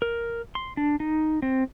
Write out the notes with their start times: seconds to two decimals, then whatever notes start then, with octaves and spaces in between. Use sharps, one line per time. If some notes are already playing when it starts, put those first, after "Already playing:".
0.02 A#4
0.55 C6
0.77 D4
1.00 D#4
1.42 C4